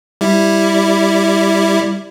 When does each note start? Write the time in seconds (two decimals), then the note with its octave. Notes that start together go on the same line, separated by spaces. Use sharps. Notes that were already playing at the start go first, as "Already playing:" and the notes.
0.21 G3 E4